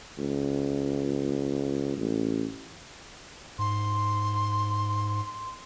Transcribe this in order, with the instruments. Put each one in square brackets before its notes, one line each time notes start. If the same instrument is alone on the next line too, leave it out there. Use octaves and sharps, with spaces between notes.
[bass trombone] C#2
A1
[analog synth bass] G#2 [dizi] C6